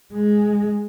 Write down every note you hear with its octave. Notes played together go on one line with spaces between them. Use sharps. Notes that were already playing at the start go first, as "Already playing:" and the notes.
G#3